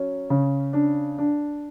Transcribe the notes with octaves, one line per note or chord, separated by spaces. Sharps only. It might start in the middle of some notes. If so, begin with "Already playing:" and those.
Already playing: F#3 C#4
C#3
D4
D4